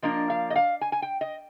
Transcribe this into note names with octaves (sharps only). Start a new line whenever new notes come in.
F3 A#3 D4 D#5
F5
D#5
F5
G#5
G#5
G5
D#5